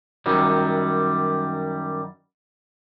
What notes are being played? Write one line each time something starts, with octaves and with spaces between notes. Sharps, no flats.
F#2 D#3 F#3 G3